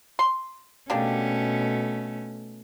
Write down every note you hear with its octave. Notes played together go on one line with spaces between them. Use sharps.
C6
B2 A3 A#3 C#4 D4 G4